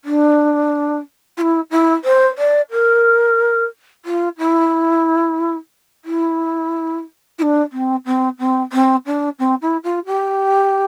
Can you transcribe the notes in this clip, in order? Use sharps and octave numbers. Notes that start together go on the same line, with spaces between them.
D4
F4
E4
E4
C5
D5
A#4
F4
E4
E4
E4
D4
C4
C4
C4
C4
D4
C4
E4
F4
G4